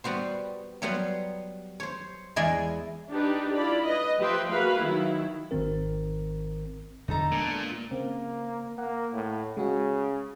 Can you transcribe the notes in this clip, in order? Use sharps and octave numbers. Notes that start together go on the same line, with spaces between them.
G3 B3 F#4 C5
F#3 G3 B3 B4 F#5 C6
C5 C#5
E2 G#3 E4 D5 D#5 G#5
D4 D#4 G4 B4
E4 F4 D5 B5
B4 D#5
F3 G4 B4 E5 G5 C6
A#3 F#4 G#4 B4 F5 B5
D#3 F#3 E4
G#1 G#2 D#3 C4 A#4
E2 D3 F3 D#4 A4 A#5
A#2 G#3 B3 D4
C#3 A#3 C4
A#3 F#5
A2
C#3 G#3 F#4